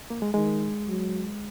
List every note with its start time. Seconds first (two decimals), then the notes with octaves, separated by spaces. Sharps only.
0.10 A#3
0.22 G#3
0.34 D#3 G#3
0.88 F#3